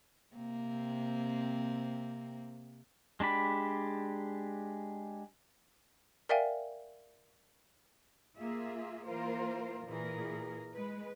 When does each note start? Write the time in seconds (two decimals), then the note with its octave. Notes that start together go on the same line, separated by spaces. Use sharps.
0.36 C3 A#3 C4
3.20 G#3 D4 G4 B5
6.29 A#4 D5 E5 F5 G5 G#5
8.38 A#3 F4 G#4 E5
9.06 E3 A#3 F4 A#4 C5
9.87 A#2 E3 G#4 A#4
10.75 G#3 B4